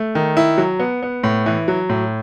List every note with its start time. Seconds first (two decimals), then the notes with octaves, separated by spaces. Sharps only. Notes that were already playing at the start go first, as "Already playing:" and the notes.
Already playing: A3
0.15 D#3
0.37 E4
0.58 F#3
0.79 B3
1.03 B3
1.24 A2
1.46 E3
1.68 F#3
1.89 A2